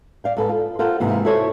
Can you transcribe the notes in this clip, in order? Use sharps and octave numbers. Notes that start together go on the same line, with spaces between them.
D5 F5 G5
G#2 A4 B4
F4
F4 A4 A#4 C5 F5 F#5
G#2 C3 E3 A#3
E4 F#4 A4 C5 C#5